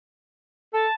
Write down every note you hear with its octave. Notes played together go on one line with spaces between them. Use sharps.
A4 A5